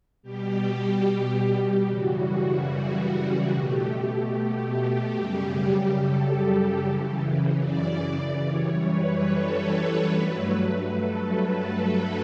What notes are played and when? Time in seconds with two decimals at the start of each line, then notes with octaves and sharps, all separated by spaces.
0.23 B2 G3 G4
1.87 F#2 C#3 E3 G3 F#4
3.51 B2 A3 G4
5.16 F#2 C#3 G3
5.98 A4
6.80 F#2 C#3 E3
7.62 D5
8.44 F#2 E3 G3 C#5
8.85 B4
9.27 A4
10.08 G2 F#3 A3 B4
10.91 A4